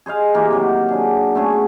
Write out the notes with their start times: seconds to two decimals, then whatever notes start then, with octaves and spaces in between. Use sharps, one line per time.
0.06 G#4 C5 D#5 F5
0.35 E3 A#3 F4 G4
0.51 C3 D#3 F#3
0.88 F#3 D4 G#4
1.35 A3 B3 C#4 G#4